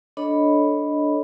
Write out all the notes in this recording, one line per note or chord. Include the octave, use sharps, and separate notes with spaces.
D4 A4 C#5 D#5 B5